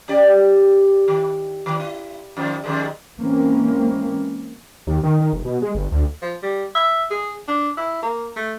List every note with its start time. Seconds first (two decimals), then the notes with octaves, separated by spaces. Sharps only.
0.08 C#4 G4 D5
1.08 D#3
1.66 D#3
1.80 E4
2.37 F2 D#3 F3
2.64 F2 D#3 G#3
3.18 E3 G#3 A#3 C4 C#4
4.87 D#2
5.03 D#3
5.20 D#3
5.33 F1
5.45 B2
5.62 G#3
5.75 G1
5.92 D2
6.22 F3
6.43 G3
6.75 E5
7.10 G#4
7.48 D4
7.77 E4
8.02 A#3
8.36 A3